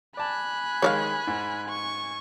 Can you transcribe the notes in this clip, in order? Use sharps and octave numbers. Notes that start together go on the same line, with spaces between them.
D5 G#5 A5 B5 F#6
D#3 G#3 C#5 D5 F5
G#2
C#6